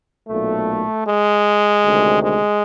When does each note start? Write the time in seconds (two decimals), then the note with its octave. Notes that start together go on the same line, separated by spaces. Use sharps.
0.27 B1 A#2 A3
1.06 G#3
1.84 D2 C3 D#3
2.23 G#3